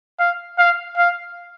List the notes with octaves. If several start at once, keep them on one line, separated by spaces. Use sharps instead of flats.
F5
F5
F5